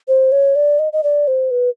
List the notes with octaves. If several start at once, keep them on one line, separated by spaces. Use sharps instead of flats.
C5
C#5
D5
D#5
D#5
D5
C5
B4